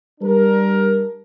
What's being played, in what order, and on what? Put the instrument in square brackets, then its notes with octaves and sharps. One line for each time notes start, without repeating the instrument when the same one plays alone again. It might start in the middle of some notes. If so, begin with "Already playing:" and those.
[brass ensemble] G3 D4 A#4